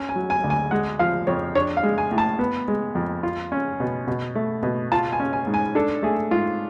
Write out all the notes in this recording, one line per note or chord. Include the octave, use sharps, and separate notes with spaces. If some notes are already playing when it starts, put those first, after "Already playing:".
Already playing: C#4
G#5
F#3
G#5
D2
G#5
G#3 F#5
F3 F5
F2 C#5
D4 C#5
F5
G#3
G#5
A2
A5
B3
G#3
F2
F4
C#4
B2
B2
A3
B2
F4 A5
G#5
C#4
G#5
G#2
G#5
D4 A4
A3 G#4
G#2 F4